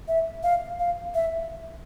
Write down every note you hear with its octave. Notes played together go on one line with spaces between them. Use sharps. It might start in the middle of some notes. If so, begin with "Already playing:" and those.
E5
F5
F5
E5